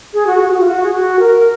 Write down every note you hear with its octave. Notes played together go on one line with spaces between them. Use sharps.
G#4
F#4
F#4
G#4
F#4
F4
F#4
G#4
F#4
A#4